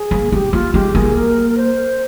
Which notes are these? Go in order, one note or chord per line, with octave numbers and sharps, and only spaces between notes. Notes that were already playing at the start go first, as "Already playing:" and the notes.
Already playing: G#4
A#3
C4 G4
A#3 F4
G#3 G4
A#3 G#4
A#4
A#4
C5